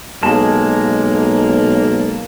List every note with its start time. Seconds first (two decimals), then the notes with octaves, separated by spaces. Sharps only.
0.23 B1 G#3 A#3 A5